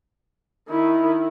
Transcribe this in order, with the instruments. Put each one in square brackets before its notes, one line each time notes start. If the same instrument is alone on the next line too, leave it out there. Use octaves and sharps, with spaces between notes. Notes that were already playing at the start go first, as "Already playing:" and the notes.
[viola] D#3 E4